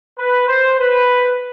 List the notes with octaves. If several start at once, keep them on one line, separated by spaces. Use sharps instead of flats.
B4
C5
B4